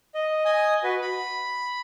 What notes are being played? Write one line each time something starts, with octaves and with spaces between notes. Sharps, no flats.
D#5
D#5 G#5 D#6
F#4 B4
B5